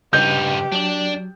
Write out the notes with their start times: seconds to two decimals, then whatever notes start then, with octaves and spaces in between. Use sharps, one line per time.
0.13 G2 C#3 D#4 G4 B4 D#5 G6
0.72 F#3 D4 D5